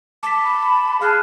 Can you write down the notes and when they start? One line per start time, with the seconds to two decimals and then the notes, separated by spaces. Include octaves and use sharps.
0.23 A5 D6 B6
0.44 B5
1.01 G#4 F5 A5 F6 F#6